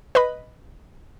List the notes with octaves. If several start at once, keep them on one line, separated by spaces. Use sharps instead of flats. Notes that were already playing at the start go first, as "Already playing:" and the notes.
B4 D#5 B5